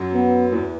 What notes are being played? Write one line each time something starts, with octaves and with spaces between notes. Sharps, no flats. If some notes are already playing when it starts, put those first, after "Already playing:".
Already playing: F#2 F#3
B3
E2 E3